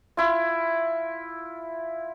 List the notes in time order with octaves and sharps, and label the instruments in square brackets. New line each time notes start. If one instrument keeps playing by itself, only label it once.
[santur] E4 F4